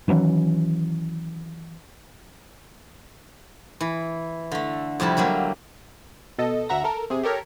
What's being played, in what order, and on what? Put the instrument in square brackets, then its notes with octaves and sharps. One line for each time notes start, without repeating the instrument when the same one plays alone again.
[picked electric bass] D#3 E3 F#3 C#4
[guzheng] E3
D3 A3
F2 C3 G3 E4 A5
D3 F#3 G3 A#3
[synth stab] B2 A4 D#5
D2 E5 F#5 A#5 A#6
A4 A#4
C3 G#4
G4 A4 A#4 C#5